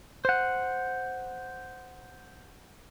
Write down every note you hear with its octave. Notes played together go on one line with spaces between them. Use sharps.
C5 F#5